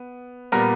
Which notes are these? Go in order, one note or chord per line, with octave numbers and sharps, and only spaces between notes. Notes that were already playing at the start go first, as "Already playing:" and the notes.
Already playing: B3
A#2 G3 B3 A#4